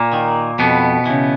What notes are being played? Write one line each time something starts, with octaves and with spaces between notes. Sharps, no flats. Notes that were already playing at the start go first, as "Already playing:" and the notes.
Already playing: A#2 A#3
D#3
F2 B2 B3
C#3 E3